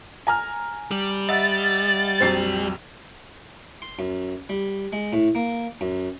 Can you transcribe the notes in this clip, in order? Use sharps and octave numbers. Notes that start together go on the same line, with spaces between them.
G#5 A#5 F6
G3
D#5 E5 F#5 A6
A#1 F2 F#3 C5 C7
C6
F#2
G3
G#3
A2
A#3
F#2